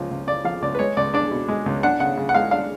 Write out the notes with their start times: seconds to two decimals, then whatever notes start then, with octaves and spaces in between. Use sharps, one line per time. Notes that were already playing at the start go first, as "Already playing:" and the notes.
Already playing: C#2 F3
0.11 C#2
0.27 C#3 D5
0.44 F3 F5
0.62 C#2 D5
0.75 B4
0.79 G#3 C#5
0.97 C#2 D5
1.14 D4 D5
1.31 B2
1.48 G#3
1.66 C#2
1.83 D4 F#5
2.00 C#3 F#5
2.17 C#3
2.29 F#5
2.34 G#3 F5
2.51 D4 F5